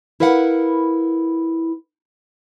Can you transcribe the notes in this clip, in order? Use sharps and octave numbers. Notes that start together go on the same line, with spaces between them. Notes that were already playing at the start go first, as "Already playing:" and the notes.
E4 A#4 B4 F5 F#5